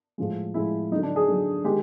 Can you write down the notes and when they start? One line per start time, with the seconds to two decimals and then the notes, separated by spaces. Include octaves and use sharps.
0.18 A2 F3 G#3
0.54 A2 F3 G#3 E4
0.91 F#3 D#4
0.96 D3
1.03 D4
1.16 G#4
1.28 D3 F#3
1.64 D#3 G#3 G4